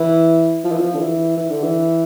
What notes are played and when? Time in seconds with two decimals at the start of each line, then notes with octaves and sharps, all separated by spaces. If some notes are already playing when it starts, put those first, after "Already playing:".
Already playing: E3
0.64 F3
0.72 E3
0.79 F3
0.95 D3
1.00 E3
1.37 E3
1.50 D3
1.63 E3